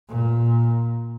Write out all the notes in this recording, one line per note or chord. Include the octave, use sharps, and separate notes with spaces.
A#2